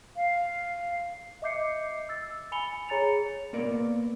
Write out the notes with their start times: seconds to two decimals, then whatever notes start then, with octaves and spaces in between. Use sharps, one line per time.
0.16 F5
1.42 D#5 E5 D6 G6 C7 C#7
2.09 E6 A6
2.52 G#5 B5 C#7 F7 G7
2.89 G#4 C#5 A#5 A6 C#7 F7
3.53 A#3 B3 A#4 D5